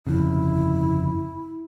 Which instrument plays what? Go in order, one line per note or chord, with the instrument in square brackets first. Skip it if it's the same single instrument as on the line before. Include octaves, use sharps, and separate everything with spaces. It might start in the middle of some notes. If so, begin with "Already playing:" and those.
[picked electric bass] G1 F2 C#3 [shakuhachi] E4